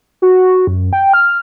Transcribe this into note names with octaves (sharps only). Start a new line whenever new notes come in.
F#4
F#2
G5
F6